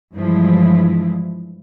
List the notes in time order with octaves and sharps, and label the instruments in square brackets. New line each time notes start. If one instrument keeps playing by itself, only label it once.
[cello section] G2 E3 F3 G#3 E4